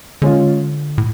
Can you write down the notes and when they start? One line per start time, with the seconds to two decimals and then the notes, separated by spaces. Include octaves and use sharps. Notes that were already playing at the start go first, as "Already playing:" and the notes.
0.22 D3 G#3 C#4 F4
0.98 A2